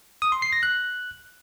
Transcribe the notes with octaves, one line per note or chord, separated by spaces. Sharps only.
D#6
C6
C7
A#6
F#6